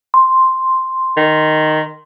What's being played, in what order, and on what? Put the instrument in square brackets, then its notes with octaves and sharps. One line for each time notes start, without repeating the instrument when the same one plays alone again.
[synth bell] C6
[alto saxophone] D#3